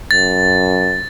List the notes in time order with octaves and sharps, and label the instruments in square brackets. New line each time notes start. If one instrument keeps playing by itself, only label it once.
[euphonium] F#2 [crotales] A6